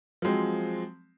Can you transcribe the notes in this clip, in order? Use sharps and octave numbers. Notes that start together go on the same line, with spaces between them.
F3 F#3 G#3 C4